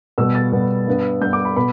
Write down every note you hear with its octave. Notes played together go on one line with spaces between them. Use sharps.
B2 G3 B3 E6
A6
B2 G3 B3
G2 G3 B3
G2 G3 B3 G6
D6
B5
B2 B3 B5